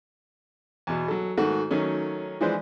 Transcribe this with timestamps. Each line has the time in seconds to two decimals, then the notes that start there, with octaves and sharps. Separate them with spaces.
0.87 E2 B2
1.08 F#3 A4
1.37 G#2 D#3 A3 F#4
1.71 D#3 F#3 A3 C#4
2.41 E3 F3 G#3 D4 B4 C5